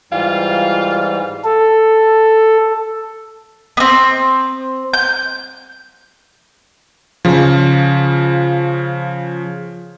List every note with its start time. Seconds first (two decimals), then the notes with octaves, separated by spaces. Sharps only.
0.12 G#2 E3 G3 F4 F5
1.44 A4
3.77 B3 C4
4.93 G6
7.25 C#3 F3